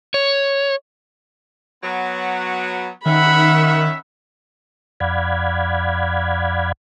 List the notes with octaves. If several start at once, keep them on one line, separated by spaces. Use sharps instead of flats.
C#5
F#3 B3
D#3 C#4 E5 F#5 B5
F2 D5 F5 F#5 B5 G#6